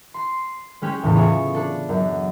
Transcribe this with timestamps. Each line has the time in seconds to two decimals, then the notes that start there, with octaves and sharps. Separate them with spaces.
0.14 C6 C7
0.82 G#3 C#4 G4 G#4
1.03 E2 A2 C#3 B3
1.15 F4 G#4 C#5 E5
1.55 D4 A4
1.89 F#2